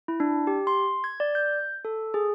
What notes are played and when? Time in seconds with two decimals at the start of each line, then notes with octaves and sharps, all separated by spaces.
0.08 E4
0.20 D4
0.47 G4
0.67 C6
1.04 G#6
1.20 D5
1.35 G6
1.85 A4
2.14 G#4